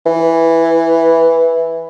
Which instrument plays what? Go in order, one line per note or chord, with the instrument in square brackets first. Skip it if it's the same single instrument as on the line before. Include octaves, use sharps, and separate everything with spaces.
[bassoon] E3